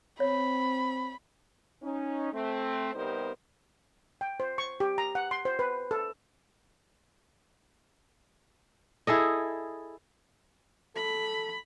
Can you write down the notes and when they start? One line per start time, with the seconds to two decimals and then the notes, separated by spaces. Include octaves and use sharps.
0.20 C4 C#5 B5
1.83 C#4 D#4
2.33 A3 C4
2.94 C3 G3 B3 D#4 A#4 C5
4.21 G5
4.40 C5
4.58 C#6
4.80 G4
4.98 A#5
5.15 F#5
5.31 C6
5.45 C5
5.59 B4
5.91 A4
9.07 E4 G#4 A4 D#5
10.96 A4 B5